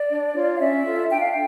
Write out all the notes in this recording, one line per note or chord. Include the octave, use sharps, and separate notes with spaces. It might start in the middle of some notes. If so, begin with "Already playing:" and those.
Already playing: D5
D4
F4 C#5
F5
C#4 E5
F4 A4
D4 G5
F5
G5